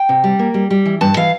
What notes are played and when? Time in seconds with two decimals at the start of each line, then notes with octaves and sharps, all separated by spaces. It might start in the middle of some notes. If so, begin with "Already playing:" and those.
Already playing: G5
0.09 C3
0.24 G3
0.39 A#3
0.54 G3
0.70 G3
0.86 E3
1.01 G2 A5
1.17 E3 F5